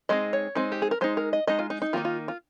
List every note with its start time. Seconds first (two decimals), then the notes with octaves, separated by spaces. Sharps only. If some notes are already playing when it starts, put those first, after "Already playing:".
0.09 G#3 C4 D#4 D#5
0.33 C#5
0.55 G#3 C4 D#4
0.72 G4
0.82 G#4
0.91 A#4
1.01 G#3 D#4 C5
1.17 A#4
1.33 D#5
1.47 G#3 D#4 D#5
1.59 F4
1.70 D#4
1.82 D#4
1.93 D#3 A#3 D#4 F4
2.05 F4
2.28 F4